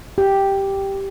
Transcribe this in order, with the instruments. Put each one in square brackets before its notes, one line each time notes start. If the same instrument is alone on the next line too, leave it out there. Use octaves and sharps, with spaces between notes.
[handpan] G4